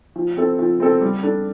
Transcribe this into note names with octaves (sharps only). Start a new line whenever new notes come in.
F3
C4 E4 A4
F3
C4 E4 A4
G3
D4 A4